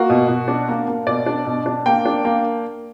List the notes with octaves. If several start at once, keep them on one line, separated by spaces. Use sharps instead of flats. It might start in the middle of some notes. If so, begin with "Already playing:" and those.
Already playing: A#3 F#4
B2
B2
D4
A#3
A#3
B2 D5
D4
B2
D4
A#3 G5
D4
A#3